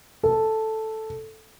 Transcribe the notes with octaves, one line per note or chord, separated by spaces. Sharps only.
A4